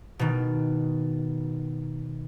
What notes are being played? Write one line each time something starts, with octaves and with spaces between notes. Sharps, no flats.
B2 D#3